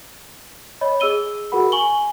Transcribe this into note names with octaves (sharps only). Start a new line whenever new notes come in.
C#5 D#5 B5
G#4 D#5 E6 D#7 G7
F#4 G#4 A#4 F#5 B5
G#5 C#6 F#7 G7